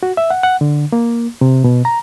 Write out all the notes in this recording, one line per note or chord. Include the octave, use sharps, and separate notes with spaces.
F#4
E5
F#5
F#5
D3
A#3
C3
B2
A#5